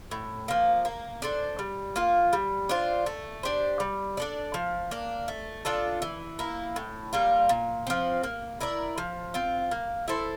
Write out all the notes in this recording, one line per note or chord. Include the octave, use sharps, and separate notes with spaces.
A2
F3 A#3
A#3
D4 A4 C5
G3
A#3 F4
G3
D4 F4 C5
A3
D4 G4 C5
G3
D4 A4 D5
F3
A#3 D4
A3
D4 F4 A4
E3
A#3 E4
A2
G3 A#3 F4
A#2
F3 C4
A#3
E4 A#4 D5
F3
C4 F4
A#3
E4 A4 C5